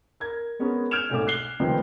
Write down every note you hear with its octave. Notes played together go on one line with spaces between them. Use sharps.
A#4 G#6
G#3 B3 C#4 G#4 A#4
F6 G6 G#6 D7 E7 F7
E1 B1 G#2 A3 D6
F#6 C7 G7
F1 C#2 D#3 F3 B4 G5